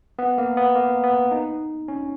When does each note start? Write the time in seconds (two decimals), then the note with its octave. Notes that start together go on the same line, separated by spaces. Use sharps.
0.19 B3
0.38 A#3
0.57 B3
0.75 A#3
1.04 B3
1.31 D#4
1.88 C#4